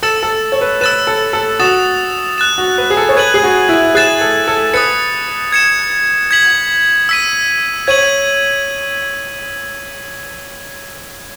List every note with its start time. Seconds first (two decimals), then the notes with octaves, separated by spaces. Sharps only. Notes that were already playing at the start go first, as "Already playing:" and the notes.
0.03 A4 E6 A6 E7
0.23 A4
0.52 C#5
0.61 B4
0.81 B4 E6 A6 E7
1.07 A4
1.33 A4
1.59 F#4 D#6 A6 E7
2.38 F#6 A6 E7
2.58 F#4
2.78 B4
2.90 G#4
2.97 A4
3.09 C#5
3.16 B4 G#6 D#7 F#7
3.34 G#4
3.43 F#4
3.69 E4
3.95 G#4 F#6 A6 E7
4.21 A4
4.48 A4
4.74 B4 D#6 A6 C#7
5.52 G#6 C#7 E7
6.31 G#6 B6 F#7
7.09 E6 B6 D#7
7.87 C#5 G#6 D#7 F#7